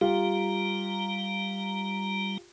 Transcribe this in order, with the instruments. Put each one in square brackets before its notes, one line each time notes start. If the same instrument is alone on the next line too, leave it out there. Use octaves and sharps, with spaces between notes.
[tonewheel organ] G3 A#5 [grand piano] F4 G4